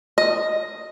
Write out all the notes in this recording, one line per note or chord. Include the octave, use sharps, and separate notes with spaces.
D#5